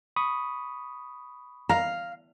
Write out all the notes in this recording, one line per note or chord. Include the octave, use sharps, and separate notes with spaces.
B5 C#6 D#6
F5 A#5